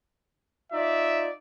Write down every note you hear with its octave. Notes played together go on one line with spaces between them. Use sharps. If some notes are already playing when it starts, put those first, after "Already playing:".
D#4 F4 D5 E5